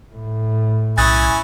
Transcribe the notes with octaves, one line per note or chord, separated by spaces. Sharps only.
A2
B1 C#4 E4 G#5 D#6 F#6 A6